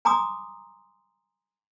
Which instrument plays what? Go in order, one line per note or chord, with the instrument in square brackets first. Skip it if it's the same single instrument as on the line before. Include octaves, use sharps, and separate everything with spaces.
[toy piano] G#5 A#5 C6 D6 D#6